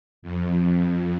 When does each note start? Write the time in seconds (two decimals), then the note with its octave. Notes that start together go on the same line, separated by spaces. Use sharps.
0.22 F2